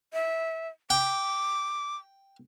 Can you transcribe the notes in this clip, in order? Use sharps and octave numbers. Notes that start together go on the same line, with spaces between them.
E5
G5 D6